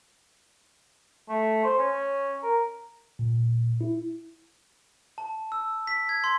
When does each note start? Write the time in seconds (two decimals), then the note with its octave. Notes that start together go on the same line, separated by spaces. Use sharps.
1.29 A3
1.64 C5
1.78 C#4
2.43 A#4
3.19 A#2
3.81 E4
5.18 A5
5.52 E6
5.87 B6
6.09 G#6
6.24 C6